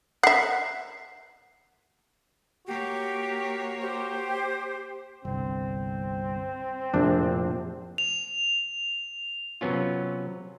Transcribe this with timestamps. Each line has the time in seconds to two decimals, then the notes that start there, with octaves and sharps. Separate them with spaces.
0.23 E5 F#5 C7
2.67 A#3 F#4 G4 C#5
3.80 G4 C5
5.25 G1 C2 C4
6.94 A#1 F2 A2 C3 D4
7.98 F7
9.61 C3 F#3 B3 C#4 F4